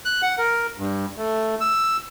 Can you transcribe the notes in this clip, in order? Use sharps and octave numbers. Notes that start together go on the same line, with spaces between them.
F#6
F#5
A#4
G2
A3
E6